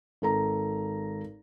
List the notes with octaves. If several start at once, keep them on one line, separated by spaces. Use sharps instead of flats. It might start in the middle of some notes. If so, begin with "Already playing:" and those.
G#1 A4 A#5